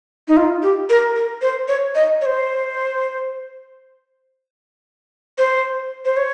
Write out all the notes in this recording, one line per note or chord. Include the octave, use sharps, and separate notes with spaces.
D#4
F4
G4
A#4
A#4
C5
C#5
D#5
C#5
C5
C5
C5
C#5